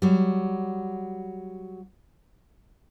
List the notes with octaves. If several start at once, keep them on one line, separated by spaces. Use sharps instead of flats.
F#3 G3